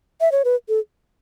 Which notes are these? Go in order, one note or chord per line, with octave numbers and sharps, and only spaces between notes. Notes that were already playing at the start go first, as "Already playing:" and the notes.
E5
C#5
B4
A4